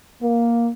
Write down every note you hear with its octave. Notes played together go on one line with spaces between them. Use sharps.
A#3